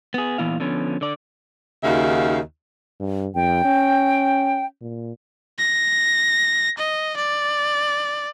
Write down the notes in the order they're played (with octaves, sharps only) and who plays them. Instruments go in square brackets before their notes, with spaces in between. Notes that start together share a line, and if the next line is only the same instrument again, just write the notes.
[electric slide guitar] B3 G#4
A#2 E3 B3 E4 F5
D3 F3 B3 C#4
D3 D5
[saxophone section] D#2 C#3 D#4 F#4 E5 F5
[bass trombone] G2
[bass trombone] F2 [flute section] G5
[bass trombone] C#4
A#2
[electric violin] A#6
D#5
D5